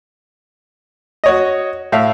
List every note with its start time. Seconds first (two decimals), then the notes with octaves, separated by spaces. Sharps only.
1.24 F#4 C#5 D#5
1.92 A2 E5 F5